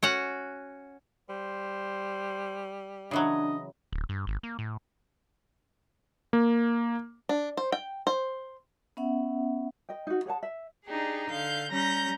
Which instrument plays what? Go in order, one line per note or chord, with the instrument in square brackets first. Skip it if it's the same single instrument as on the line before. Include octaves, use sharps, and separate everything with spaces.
[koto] C#4 F#4 F#5
[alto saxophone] G3 [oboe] C5
[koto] C#3 E3 F#3 [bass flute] D4 [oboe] D#5
[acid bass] D1
G2
G#1
A#3
A2
[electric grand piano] A#3
[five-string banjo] D4
C5
G5
C5
[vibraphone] B3 C#4 E5 F#5
[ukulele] D#5 G5
D#4 F#4
G#4 C#5 F#5 A5
E5
[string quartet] D4 D#4 G4 G#4
D3 F5 G6
G3 C#4 A#5 G6 A#6